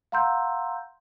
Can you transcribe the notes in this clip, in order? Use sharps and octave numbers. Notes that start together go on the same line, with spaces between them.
F5 F#5 A#5 C6 E6 G6